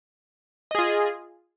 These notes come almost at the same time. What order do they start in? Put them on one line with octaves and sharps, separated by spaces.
D#5 G#4 F4